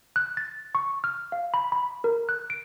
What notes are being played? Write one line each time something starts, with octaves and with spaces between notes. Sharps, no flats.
F#6
A6
C#6
F6
F5
B5
B5
A#4
F#6
D7